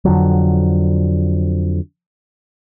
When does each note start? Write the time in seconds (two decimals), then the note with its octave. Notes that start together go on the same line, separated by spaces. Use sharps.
0.05 F2 D3 F3 F#3